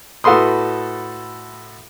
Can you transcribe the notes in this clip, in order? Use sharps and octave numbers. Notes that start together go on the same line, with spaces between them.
A2 F#4 A4 B4 C6 D#6